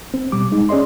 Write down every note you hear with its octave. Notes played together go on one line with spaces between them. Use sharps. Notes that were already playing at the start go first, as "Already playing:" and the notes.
C4
B2 G3 D6
G#3 D#4
C#4 G#4 D5 D#5 C6